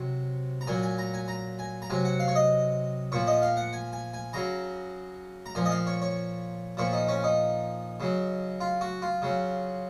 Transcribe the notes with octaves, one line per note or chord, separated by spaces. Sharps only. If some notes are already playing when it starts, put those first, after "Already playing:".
Already playing: C3 F#3
A#5
A#2 F#3 G#5
G#5
A#5
G#5
A#5
G#5
A#5
C3 F#3 G#5
F#5
F5
C#5
D#5
A#2 F3 C#5
D#5
F5
F#5
G#5
G#5
G#5
C#3 F#3 A#5
A#5
A#2 F3 G#5
D#5
F5
C#5
C#5
A#2 F3 C#5
D#4
C#4
D#4
C#3 F#3
F4
F#4
F4
C#3 F#3